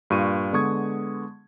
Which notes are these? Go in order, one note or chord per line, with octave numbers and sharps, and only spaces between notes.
G2 A#2 F4 C#6 D#7
D3 G#3 B3 C#6 D#6 G#6